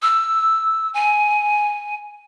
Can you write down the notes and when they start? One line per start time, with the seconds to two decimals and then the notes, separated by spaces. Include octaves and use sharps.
0.02 E6
0.94 G#5